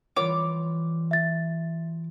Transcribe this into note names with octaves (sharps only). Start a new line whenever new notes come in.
E3 G3 F4 C#5 D6
E5 A6